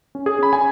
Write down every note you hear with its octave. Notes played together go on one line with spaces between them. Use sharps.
C#4
G#4
C#4 B5
G#5